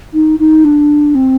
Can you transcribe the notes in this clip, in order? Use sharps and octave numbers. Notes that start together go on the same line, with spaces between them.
D#4
D#4
D4
C4